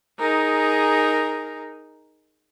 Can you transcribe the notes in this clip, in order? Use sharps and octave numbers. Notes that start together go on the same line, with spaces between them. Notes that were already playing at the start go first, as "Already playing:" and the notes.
D#4 G#4 A#4